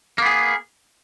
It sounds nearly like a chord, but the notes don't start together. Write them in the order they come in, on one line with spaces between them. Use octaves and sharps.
A#3 B3 G#4